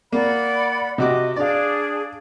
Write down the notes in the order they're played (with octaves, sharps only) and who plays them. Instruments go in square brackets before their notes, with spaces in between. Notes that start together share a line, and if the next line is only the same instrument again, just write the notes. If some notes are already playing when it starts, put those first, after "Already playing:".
[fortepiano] A#3 [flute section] D5 F#5 B5
[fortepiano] C3 F#4 D6 [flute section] D#5
[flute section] D4 G#4 [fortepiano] D5 F5